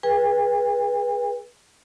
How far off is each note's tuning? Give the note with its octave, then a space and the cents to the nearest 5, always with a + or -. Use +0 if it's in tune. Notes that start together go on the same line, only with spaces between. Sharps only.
G#4 +0 B4 -25 G5 +45